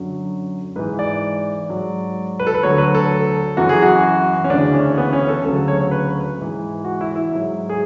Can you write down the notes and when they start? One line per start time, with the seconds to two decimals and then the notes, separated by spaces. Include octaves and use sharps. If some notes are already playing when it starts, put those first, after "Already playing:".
Already playing: F#2 D3 F#3
0.76 G#2 E3 B4
0.99 D5
1.69 G#2 F#3
2.40 B4
2.47 A4
2.55 B4
2.63 D2 D3 F#3 C#5
2.78 B4
2.95 A4
3.57 F#2 E3 F#4
3.69 G#4
3.82 F#4
4.44 C#4
4.50 D2 C#3 E3 D4
4.74 C#4
4.98 B3
5.13 C#4
5.29 A4
5.44 D2 C#3 F#3 A4
5.68 C#5
5.79 C#5
5.91 B4
6.38 G#2 E3
6.85 F#4
7.01 E4
7.16 E4
7.32 G#2 F#3
7.69 G#4